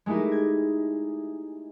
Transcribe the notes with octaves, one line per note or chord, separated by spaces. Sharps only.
G#3 A3 D#4 E4 G4
G#6